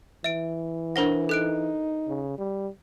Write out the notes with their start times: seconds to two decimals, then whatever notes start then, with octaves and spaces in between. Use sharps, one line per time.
0.24 E3 E5 D7
0.96 D4 A#4 C5 F#5 A#6
1.29 D#4 A4 F#6 D7
2.07 C#3
2.38 G3